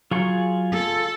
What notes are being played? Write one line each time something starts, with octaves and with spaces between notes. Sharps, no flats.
F#3 F4 G#4 C#6
A4